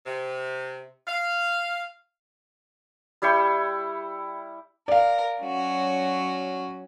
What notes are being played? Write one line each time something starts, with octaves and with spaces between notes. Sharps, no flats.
C3
F5
G3 E4 G5 C#6
A#4 D5 F5
F#3 C#4 F#4